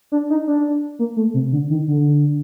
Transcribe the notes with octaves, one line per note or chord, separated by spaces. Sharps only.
D4
D#4
D4
A#3
A3
C3
D3
D#3
D3